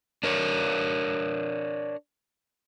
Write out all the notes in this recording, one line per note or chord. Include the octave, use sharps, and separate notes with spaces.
D4 A#4 C#5